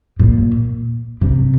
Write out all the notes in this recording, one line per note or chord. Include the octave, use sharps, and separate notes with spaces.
A#2
C3